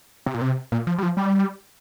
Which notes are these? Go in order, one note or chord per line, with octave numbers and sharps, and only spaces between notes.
C3
A#2
C3
A#2
F3
G3
F3
G3